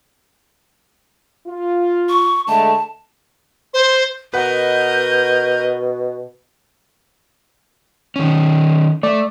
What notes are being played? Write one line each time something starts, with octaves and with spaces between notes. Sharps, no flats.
F4
C#6
D3 G#3 A3 A5
C5
B2 A#4 B4 D#5 F#5 G6
D#3 C#4
A3 D5